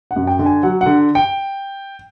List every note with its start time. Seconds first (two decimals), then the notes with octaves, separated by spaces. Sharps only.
0.11 F#5
0.16 F#2
0.27 G5
0.39 D3
0.46 G#5
0.63 F#3 F#5
0.81 D3 F#5
1.15 G5